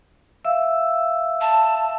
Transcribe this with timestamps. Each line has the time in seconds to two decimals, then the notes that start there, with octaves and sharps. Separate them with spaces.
0.44 E5 F5 E6
1.41 A5